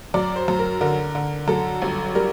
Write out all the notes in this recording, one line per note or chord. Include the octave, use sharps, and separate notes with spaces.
F#2 D5
C5
F#2
A#4
D3 A#4
D3
F#2 A4
G1
G3 A#4